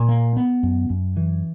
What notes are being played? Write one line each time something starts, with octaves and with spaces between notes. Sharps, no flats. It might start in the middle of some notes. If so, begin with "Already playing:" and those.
Already playing: A#2
A#3
B3
F#2
F#2
E3